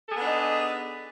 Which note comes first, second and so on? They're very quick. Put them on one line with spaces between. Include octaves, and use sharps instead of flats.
A4 G#4 B3 D4 D#4